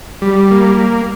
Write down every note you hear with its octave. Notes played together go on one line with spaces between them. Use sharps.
G3
A#3